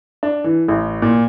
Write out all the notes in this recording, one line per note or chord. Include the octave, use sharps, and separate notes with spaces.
D4
E3
A1
A#2